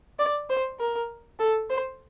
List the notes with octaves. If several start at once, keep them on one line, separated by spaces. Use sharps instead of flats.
D5
C5
A#4
A4
C5